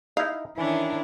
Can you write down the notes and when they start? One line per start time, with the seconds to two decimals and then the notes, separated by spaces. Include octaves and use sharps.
0.17 D#4 E4 F5
0.58 D#3 E3 C#4 D4 E4